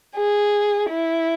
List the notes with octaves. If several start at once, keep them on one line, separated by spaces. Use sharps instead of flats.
G#4
E4